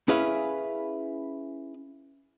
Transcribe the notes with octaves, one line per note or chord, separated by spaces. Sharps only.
C#4 E4 G#4 B4 E5 F5